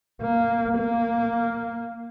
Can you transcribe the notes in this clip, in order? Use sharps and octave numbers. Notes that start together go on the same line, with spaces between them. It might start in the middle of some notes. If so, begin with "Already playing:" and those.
A#3
A#3